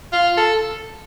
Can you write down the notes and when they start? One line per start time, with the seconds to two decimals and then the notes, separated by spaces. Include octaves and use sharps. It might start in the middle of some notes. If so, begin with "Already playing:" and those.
0.12 F4
0.37 A4